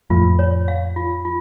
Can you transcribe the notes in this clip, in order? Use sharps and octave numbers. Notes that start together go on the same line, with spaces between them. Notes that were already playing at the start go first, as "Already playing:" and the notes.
F2 A2 F4
C#5
F5
F4
F4